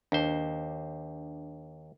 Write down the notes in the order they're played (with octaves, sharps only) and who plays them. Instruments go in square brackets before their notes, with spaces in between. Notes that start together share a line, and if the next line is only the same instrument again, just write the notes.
[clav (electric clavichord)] D#2 C5 [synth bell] D4